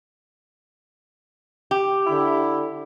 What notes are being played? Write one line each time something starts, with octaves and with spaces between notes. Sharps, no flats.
G4
D3 E4